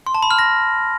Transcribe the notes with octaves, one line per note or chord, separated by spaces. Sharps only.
C6
A5
B5
F6
A#6